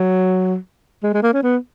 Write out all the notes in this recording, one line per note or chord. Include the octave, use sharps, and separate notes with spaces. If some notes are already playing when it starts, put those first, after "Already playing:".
Already playing: F#3
G#3
G#3
A#3
C#4
B3